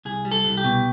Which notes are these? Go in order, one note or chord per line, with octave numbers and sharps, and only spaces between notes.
C2 G#4
G3
A4
C2
G4
B2